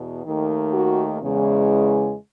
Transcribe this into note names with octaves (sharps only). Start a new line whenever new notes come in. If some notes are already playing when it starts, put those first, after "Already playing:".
Already playing: E2 B2
D#2 D#3 A3
F#4
E2 C#3 G#3